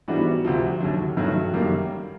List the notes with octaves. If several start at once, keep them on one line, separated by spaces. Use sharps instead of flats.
G#2 E3 G3 B3 D4 F#4
D2 C3 F3
D#2 D3 F#3
G2 D#3 F#3 A3 F#4
F#2 D#3 G3 A#3